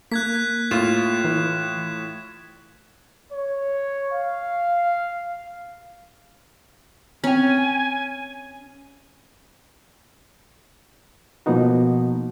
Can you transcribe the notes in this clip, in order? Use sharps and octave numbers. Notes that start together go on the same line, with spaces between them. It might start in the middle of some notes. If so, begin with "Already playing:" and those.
A#3 F#6 G#6 B6
A2 F4 E7
E3
C#5
F5
C4 C#4 G5 G#5
B2 F3 A#3 B3 D#4 F#4